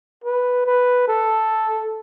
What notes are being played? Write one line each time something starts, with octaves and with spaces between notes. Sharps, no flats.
B4
B4
A4